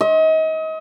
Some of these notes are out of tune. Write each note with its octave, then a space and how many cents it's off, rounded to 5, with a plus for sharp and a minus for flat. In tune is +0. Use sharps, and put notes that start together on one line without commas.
D#5 +35